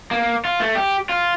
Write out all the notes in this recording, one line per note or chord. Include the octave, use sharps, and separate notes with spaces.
A#3
F4
A3
G4
F4